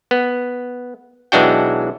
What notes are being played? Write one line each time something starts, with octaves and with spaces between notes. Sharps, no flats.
B3
B1 E3 G#3 D4 F#4 G5